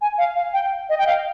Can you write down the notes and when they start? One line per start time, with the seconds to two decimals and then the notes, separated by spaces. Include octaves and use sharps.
0.01 G#5
0.18 F5
0.36 F5
0.53 G5
0.89 D#5
0.98 G5
1.07 F5